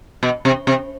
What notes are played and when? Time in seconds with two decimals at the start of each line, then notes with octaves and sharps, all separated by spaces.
0.23 B2
0.45 C3
0.67 C3